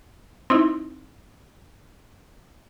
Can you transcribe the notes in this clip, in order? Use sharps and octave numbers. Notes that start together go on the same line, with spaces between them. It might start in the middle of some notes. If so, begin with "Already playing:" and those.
C4 D#4 E4